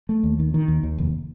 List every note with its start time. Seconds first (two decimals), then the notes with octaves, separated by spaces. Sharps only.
0.09 A3
0.23 D#2
0.39 D#3
0.54 D#3
0.68 D#2
0.83 D#2
0.98 F1